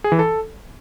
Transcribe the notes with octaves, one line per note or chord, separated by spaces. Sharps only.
G#4
E3
A4